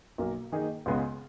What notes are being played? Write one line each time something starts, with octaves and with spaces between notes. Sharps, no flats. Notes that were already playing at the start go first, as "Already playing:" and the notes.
B1 B2 A#3
D#3 A#3 D#4 G#4
C#2 C#3 G#3 B3